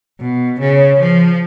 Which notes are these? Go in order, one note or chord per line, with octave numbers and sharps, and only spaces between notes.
B2
C#3
F3